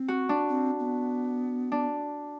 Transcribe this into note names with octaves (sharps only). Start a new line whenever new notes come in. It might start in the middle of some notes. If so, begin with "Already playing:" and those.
Already playing: C4
F#4
D4
C4
B3
D4